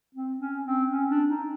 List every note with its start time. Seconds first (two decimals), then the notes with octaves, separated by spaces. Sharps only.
0.15 C4
0.40 C#4
0.65 C4
0.91 C#4
1.10 D4
1.29 D#4